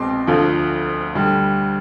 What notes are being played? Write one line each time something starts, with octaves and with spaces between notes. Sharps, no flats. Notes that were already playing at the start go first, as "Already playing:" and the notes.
Already playing: C2 B2 G#3 C4 C6 D6
D2 D3 F3
D2 D3 G3